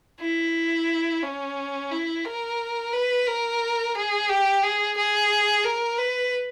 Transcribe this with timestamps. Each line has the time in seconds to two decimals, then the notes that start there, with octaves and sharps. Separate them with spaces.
0.20 E4
1.23 C#4
1.91 E4
2.25 A#4
2.93 B4
3.27 A#4
3.95 G#4
4.29 G4
4.63 G#4
4.97 G#4
5.64 A#4
5.98 B4